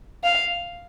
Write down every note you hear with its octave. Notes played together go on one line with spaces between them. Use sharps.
F5